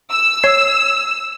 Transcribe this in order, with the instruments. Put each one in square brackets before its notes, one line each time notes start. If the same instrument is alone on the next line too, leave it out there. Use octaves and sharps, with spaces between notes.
[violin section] E6
[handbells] C#5 C7